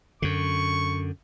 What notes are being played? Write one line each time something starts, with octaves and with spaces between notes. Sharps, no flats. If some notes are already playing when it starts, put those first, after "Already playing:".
F#2 D3 C#6